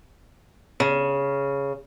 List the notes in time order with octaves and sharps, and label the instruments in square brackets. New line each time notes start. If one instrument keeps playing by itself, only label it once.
[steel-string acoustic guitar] C#3